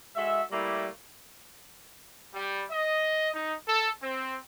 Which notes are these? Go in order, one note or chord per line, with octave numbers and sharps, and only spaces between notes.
G#3 F#4 A4 E5
G3 A3 A#3 E4
G3
D#5
D#4
A4
C4